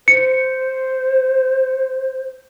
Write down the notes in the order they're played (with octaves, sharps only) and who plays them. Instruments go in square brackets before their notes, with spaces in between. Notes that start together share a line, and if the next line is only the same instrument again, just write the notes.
[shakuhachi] C5 [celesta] C#7